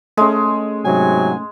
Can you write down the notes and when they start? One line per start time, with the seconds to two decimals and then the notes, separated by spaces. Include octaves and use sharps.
0.17 G#3 A3 C#4
0.85 G#2 C3 F#3 G#5